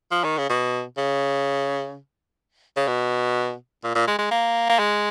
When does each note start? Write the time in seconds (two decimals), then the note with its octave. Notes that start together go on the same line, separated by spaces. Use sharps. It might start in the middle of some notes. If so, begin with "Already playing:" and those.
0.11 F3
0.24 D#3
0.38 C#3
0.49 B2
0.98 C#3
2.77 C#3
2.88 B2
3.84 A#2
3.95 A#2
4.08 G#3
4.18 G#3
4.31 A#3
4.69 A#3
4.79 G#3